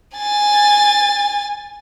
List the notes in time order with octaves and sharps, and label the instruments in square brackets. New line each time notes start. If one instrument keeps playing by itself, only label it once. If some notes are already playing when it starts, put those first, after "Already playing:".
[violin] G#5 A6